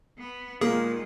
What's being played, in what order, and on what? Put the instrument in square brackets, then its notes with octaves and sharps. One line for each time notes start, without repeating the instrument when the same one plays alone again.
[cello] B3
[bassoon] A#2 [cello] D#3 G#3 [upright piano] A#3 [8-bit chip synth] G#4